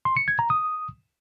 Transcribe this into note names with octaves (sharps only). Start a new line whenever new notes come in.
C6
C#7
G#6
A#5
D#6